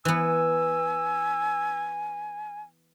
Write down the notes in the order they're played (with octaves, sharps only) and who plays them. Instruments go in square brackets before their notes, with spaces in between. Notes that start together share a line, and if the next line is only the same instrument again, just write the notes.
[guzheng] E3 B3 [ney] G#5 [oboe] E6